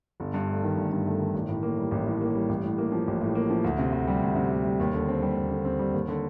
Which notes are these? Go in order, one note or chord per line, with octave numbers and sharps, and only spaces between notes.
G1
G2
A3
D#3
G1
G2
A3
D#3
A1
A2
A#3
G3
A1
A2
A#3
G3
A1
A2
A#3
F3
A1
A2
A#3
F3
D2
C3
D2
G3
D2
C3
D2
G3
D#2
D3
C4
G3
D#2
D3
C4
G3
D#2
D3